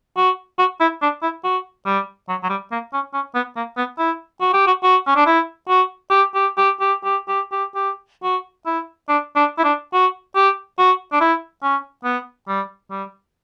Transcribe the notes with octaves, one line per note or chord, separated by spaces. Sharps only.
F#4
F#4
E4
D4
E4
F#4
G3
F#3
F#3
G3
A#3
C#4
C#4
B3
A#3
B3
E4
F#4
G4
F#4
F#4
C#4
D4
E4
F#4
G4
G4
G4
G4
G4
G4
G4
G4
F#4
E4
D4
D4
E4
D4
F#4
G4
F#4
D4
E4
C#4
B3
G3
G3